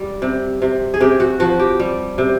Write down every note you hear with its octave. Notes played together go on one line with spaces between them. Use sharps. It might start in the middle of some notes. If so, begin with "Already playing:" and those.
Already playing: G3
C3
C3
G#4
C3 G4
F#4
F3 F#4
G4
G3
C3